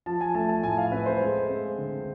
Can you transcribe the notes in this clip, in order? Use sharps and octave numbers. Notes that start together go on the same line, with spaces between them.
F3 A5
G#5
A3 A5
A5
A2 G#5
F5
C4 B4
C5
G#3
C4
D3